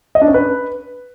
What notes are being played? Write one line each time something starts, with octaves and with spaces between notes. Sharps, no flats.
D#5
D4
C#4
B4